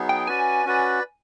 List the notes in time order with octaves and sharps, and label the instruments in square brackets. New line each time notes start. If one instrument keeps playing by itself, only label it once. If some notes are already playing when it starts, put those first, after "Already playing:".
Already playing: [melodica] F#3 B3 D#4 G#4
[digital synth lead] G5
[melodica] C#4 F#4 B4 D5 [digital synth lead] G#5
[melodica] C#4 F#4 B4 D5